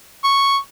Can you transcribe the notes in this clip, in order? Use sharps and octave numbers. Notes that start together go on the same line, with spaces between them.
C#6